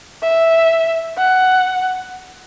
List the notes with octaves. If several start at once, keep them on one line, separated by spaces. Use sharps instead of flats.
E5
F#5